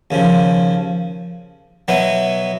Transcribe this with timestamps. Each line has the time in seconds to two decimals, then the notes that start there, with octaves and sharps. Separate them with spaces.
0.11 D#2 C#3 F3
1.88 B2 F#3 B3 E4